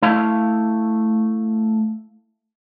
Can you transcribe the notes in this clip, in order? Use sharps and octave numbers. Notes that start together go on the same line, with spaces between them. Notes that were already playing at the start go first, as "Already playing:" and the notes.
A3 E4 F5